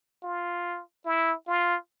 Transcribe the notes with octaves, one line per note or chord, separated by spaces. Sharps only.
F4
E4
F4